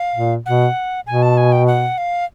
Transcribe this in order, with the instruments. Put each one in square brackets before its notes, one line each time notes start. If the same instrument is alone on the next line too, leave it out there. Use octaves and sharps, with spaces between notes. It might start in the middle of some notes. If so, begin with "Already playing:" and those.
Already playing: [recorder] F5
[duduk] A#2
[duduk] B2 [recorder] F#5
[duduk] B2 [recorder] G#5
[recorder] A5
G#5
G5
F#5
F5